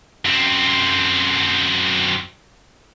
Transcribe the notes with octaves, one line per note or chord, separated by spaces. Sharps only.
F#2 C4